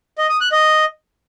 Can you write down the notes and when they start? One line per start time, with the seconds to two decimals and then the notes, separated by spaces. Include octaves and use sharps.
0.18 D#5
0.29 D#6
0.41 F#6
0.52 D#5